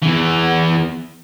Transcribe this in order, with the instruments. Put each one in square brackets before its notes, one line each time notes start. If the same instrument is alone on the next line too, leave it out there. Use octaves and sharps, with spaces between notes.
[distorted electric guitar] E2 E3